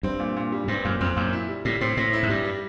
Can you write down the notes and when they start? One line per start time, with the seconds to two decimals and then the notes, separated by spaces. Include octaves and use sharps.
0.03 G2 C4
0.20 A#2
0.36 A#2
0.52 G3
0.68 G2 C4
0.84 F#2 A#2
1.01 F2 C4
1.16 F#2 A#2
1.33 E4
1.49 G3
1.65 A2 G3
1.81 A2 C4
1.97 A2 C4
2.13 E4
2.23 G#2
2.29 G2 G3
2.45 G3